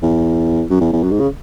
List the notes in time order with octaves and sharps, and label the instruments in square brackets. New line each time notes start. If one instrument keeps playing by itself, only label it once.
[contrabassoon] E2
F#2
E2
E2
F#2
G#2
C#3